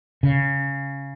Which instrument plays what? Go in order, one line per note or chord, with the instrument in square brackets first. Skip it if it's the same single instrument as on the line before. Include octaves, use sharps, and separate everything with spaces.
[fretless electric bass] C#3